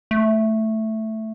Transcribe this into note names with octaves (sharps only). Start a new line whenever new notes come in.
A3